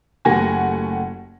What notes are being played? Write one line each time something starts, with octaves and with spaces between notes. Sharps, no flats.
F#1 A3 G4 F#5 G#5 A#6